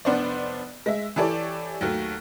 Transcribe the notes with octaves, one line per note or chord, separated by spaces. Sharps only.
F1 B3 D4 C5 D5
G#3 E5
E3 E4 G4 A4 C#5 D5
D#2 F#3 A3